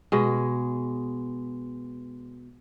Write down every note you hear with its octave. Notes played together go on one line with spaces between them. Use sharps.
B2 G#3